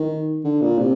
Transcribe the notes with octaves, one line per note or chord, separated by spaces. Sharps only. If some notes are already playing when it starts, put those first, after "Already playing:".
Already playing: D#3
D3
A#2
C3